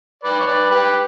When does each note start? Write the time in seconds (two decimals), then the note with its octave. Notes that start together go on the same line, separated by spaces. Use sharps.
0.23 B4 D5
0.40 C#5
0.47 B4 D5
0.70 G4 B4